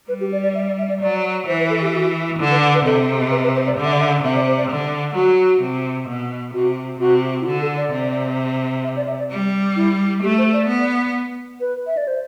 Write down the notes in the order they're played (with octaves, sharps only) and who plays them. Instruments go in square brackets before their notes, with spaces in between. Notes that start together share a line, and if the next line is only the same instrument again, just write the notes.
[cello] G3 [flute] B4
[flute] G4
D5
D5
E5
D5
E5
D5
[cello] F#3 [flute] D5
[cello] E3 [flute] C5
[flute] B4
A4
G4
F#4
[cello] D3 [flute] E4
[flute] B4
B4
[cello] C3 [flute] A4
[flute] B4
B4
C5
D5
[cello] D3
[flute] E5
D5
E5
[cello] C3 [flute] E5
[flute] D5
C5
D5
[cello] D3
[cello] F#3 [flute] F#4
[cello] C3
B2
[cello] C3 [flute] F#4
[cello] C3 [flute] F#4
[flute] E4
[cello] D3 [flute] F#4
[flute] A4
D5
[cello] C3
[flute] E5
D5
E5
D5
[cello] G3
[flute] E4
[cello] A3 [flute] G4
[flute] C5
D5
[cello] B3
[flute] B4
E5
D5
C5